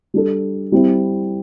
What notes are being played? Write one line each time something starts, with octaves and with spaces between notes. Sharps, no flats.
G3 D4 A4
G3 C4 E4